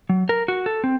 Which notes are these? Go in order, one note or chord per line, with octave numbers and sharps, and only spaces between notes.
F#3
A#4
F#4
A4
C4